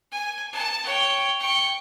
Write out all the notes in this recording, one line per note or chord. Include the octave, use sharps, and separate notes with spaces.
G#5
A5
C#5 G5
G5 C#6